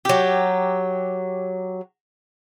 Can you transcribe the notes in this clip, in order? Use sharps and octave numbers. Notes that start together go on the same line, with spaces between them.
F#3 G4